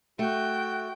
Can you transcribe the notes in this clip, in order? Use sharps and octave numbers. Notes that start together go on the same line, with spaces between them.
A3 F#4 G5